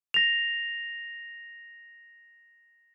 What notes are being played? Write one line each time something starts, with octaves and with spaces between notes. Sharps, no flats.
A#6 F7